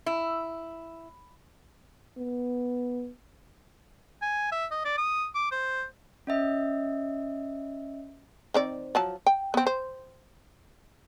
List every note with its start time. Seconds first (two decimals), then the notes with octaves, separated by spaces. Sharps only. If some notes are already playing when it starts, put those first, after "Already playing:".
0.06 E4
2.17 B3
4.22 G#5
4.52 E5
4.71 D#5
4.85 D5
4.97 D#6
5.35 D6
5.51 C5
6.27 C#4 D#5 E5
8.54 D#3 C4 D5
8.95 F3 F#3 A5
9.26 G5
9.54 B3 C4
9.66 C5